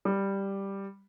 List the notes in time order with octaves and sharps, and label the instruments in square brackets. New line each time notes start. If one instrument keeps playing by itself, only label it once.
[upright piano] G3